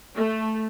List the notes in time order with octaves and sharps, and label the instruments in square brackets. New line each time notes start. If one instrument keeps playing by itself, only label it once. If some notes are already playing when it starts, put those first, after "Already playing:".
[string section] A3